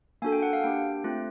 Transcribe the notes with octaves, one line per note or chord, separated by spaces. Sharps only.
A#3 D4 F#4 A4 G#5
G5
F#5
F5
A#3 D4 G4 G5
A3 C4 F4